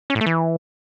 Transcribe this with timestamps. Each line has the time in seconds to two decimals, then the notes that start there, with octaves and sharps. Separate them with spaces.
0.10 C#4
0.15 A2
0.21 A3
0.26 E3